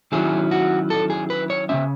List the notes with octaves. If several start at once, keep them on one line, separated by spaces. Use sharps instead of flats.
D#3 F#3 C#4 E4 G#4
F#4
A4
G#4
B4
C#5
C#3 G#3 C#4 E5